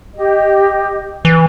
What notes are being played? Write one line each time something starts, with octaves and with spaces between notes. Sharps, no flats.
G4 D#5
E3